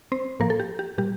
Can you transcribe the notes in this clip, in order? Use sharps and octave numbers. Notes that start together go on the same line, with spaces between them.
C4 C5
A2 F3 A#3 A#4
A4
G4
G4
A#2 G3 G4